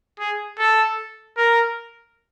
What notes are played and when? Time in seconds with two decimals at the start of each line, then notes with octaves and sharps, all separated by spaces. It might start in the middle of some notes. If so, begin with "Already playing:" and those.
0.20 G#4
0.59 A4
1.37 A#4